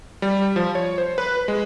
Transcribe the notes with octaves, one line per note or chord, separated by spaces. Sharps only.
G3
F3
C#5
C5
B4
G#3